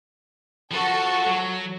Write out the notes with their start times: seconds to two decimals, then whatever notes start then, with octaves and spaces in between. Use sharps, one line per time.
0.71 F3 F#4 A4
1.26 F#3